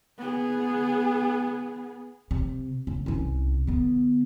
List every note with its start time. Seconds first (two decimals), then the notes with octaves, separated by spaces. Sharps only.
0.18 B3 G#4
2.31 C3
2.87 C#3
3.06 C2 C#4
3.67 D3 B3